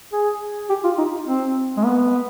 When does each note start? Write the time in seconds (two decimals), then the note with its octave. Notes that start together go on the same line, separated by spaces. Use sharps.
0.13 G#4
0.69 G4
0.84 F4
0.98 D#4
1.27 C4
1.77 G#3
1.84 B3